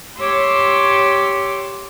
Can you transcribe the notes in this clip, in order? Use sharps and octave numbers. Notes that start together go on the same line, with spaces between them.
G4 C#5 C6 D6 E6